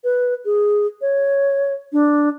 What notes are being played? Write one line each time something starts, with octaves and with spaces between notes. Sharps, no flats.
B4
G#4
C#5
D4